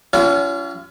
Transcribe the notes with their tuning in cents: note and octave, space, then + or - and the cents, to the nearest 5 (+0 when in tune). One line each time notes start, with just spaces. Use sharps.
F#3 +35 C#4 +35 F4 -35